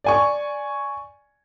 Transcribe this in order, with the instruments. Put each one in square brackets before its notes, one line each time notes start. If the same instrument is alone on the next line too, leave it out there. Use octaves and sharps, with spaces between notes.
[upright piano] D5 G#5 C#6